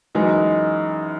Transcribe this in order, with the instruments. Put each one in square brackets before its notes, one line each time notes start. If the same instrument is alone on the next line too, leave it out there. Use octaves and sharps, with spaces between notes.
[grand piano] F#2 E3 G#3 D#4